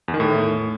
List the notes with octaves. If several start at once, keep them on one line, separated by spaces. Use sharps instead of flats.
E2
D#3
A2